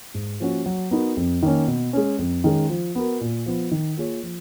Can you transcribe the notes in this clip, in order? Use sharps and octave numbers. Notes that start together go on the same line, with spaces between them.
G#2
F3 A#3 C#4 F#4
F#3
B3 D#4 F#4 A#4
F2
D#3 A#3 C#4
B2
G#3 C#4
F2
D#3 G#3 C#4 G#4
F3
B3 F#4 A#4
A#2
F3 B3
D#3
A#3 F4 G#4 C#5
F3